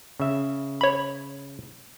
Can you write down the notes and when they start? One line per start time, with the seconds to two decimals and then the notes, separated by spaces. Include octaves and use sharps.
0.20 C#3 E5
0.81 C#5 B5